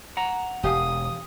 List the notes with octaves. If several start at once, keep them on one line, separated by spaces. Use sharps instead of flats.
F#5 A#5
E1 G4 F5 G#5 D#6